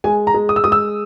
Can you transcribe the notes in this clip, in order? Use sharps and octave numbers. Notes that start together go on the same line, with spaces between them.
G#3 G#5
A#5
G#3
D#6
E6
G#3 D#6
E6